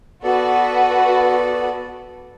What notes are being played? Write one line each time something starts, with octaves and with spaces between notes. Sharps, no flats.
B3 F#4 A4 B4 D5